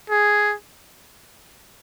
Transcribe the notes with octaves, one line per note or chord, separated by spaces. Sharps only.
G#4